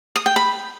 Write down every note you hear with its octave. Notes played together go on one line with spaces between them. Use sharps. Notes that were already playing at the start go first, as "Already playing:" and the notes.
D#6
G5
B5